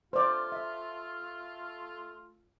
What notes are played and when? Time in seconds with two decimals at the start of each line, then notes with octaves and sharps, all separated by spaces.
0.13 A3 F4 C5 D5
0.52 E5